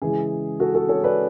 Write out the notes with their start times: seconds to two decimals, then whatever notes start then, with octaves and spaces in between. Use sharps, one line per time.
0.02 C#3 E3 G#3 G#4
0.60 F#4 A4
0.75 F#4 A4
0.89 A4 C#5
1.04 B4 D5